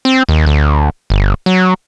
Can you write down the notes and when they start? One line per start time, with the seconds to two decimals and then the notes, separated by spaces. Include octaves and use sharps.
0.05 C4
0.29 D#2
0.46 D2
1.10 G1
1.46 F#3